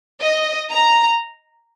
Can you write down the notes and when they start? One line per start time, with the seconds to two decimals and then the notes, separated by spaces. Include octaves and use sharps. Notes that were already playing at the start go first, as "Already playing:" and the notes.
0.21 D#5
0.70 A#5